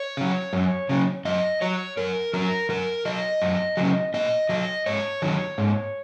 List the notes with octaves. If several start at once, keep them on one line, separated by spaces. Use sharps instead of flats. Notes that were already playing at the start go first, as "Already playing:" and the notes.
Already playing: C#5
C#3 F#3
F#2
C#3 F#3
F#2 D#5
F#3 C#5
F#2 A#4
F#3 A#4
F#2 A#4
F#3 D#5
F#2
C#3 F#3
A#2 D#5
F#3 D#5
G#2 C#5
D#3 F#3
G#2